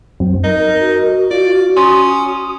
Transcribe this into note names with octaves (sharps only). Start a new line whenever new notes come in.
F#2 F#3 C4
D#4 A#4
F#4
F4 D5
C#4 C6 D#6